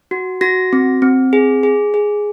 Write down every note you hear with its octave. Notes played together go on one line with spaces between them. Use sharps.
F#4
F#4 A#6
C4
C4
G#4
G#4
G#4